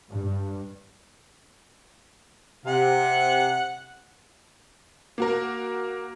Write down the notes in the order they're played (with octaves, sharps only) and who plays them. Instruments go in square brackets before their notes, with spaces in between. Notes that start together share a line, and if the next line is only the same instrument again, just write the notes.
[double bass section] G2
[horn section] C3 [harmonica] F#5
[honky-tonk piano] A#3 F#4 A#4